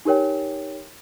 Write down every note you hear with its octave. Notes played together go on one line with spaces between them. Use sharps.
D#4 G4 A#4 C#5 G5